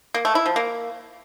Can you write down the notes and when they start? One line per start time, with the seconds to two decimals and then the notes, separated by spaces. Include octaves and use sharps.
0.14 A#3
0.25 A3
0.35 E4
0.46 F3
0.56 A#3